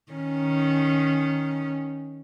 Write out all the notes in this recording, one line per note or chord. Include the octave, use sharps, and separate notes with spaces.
D#3 C#4